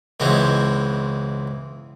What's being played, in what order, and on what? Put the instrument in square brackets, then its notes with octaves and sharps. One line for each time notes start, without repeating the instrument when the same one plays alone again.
[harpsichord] C#2 B2 E3 G#3 C4